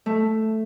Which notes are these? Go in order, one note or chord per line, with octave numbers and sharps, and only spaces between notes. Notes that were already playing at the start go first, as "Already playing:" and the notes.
A3